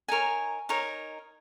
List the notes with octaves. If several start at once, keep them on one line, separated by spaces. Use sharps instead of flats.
D#4 A#4 C#5 G#5
D#4 A#4 C#5